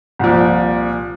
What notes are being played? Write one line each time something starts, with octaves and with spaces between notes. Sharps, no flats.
C2 A#2 F3